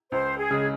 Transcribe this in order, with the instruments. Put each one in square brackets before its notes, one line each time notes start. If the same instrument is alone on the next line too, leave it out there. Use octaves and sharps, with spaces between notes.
[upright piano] C#2 [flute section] C5
[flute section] G#4
[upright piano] C#3 G#3